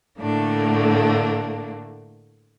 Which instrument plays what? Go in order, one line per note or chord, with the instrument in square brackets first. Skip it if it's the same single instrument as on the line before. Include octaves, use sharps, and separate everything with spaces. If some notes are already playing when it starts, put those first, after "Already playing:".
[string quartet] A2 D3 A3 A#3 D4